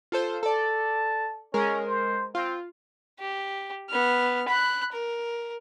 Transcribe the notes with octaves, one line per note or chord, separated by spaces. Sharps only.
F4 A4 C5
A4 D5 A5
G#3 C#4 A#4
C5
C4 F4
G4
B3 F6
B5 F#6
A#4